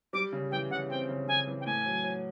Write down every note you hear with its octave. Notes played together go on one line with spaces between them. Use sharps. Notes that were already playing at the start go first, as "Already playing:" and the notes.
G3 D6
C#3
E3 G5
C#3 F#5
C4 G5
C#3
C#3 G#5
E3
G5
A2 G#5
F#3
F#3